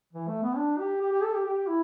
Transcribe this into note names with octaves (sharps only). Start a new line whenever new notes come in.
E3
A3
B3
D4
G4
G4
G4
A4
G4
G4
E4